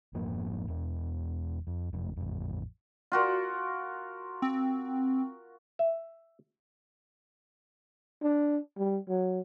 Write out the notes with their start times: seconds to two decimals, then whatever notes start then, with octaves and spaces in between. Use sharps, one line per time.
0.14 F1 G#2 F3 A#3
0.68 E1 E2 D4
1.67 F2
1.93 F#1 F2
2.16 A1 F2
3.12 F4 F#4 A#4
4.42 C4
5.79 E5
8.22 D4
8.77 G3
9.08 F#3